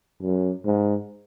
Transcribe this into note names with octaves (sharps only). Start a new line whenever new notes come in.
F#2
G#2